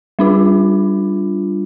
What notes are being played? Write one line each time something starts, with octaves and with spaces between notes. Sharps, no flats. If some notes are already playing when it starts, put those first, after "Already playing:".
G3 D4 F4